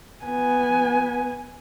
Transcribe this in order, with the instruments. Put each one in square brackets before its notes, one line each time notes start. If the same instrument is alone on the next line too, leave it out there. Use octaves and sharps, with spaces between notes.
[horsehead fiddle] B3 G#5